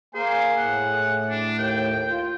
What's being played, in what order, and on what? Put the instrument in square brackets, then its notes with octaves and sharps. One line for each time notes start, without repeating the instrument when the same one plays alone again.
[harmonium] A#3 A#4 G#5 [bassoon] G#4 [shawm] C5
[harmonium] A2 [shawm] F#5
[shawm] D4
[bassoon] D#2 [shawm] G5
[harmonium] F4